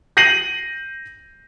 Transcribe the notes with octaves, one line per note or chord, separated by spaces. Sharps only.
G6 A#6 C7 D#7 F#7